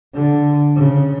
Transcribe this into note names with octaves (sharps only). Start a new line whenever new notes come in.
D3
C#3